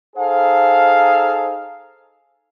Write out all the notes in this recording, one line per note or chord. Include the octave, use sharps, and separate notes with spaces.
D#4 G#4 A4 C5 F5